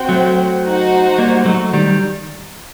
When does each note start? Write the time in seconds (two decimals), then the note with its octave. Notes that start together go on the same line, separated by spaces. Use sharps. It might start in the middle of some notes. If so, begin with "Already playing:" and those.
Already playing: C4 F#4 C5 G5
0.09 F#3 A3
0.63 D#4 F#4 C5
1.18 G3 A#3
1.46 F#3 A3
1.73 D#3 G3